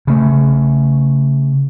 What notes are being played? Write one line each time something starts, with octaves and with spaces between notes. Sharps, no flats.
C#3 A3